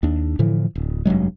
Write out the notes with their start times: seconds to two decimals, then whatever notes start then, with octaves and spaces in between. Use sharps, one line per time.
0.03 D#2 D4
0.39 A2 D3 E3 F3
0.75 D1
1.05 F1 G2 F#3 G#3